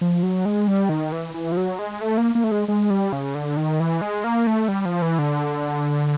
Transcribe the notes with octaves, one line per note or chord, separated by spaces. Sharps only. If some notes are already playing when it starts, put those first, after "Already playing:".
F3
F#3
G#3
G3
D#3
E3
E3
F3
F#3
G#3
A3
A#3
A#3
A3
G#3
G#3
G3
C#3
D3
D#3
E3
G#3
A#3
A3
G3
F3
E3
D3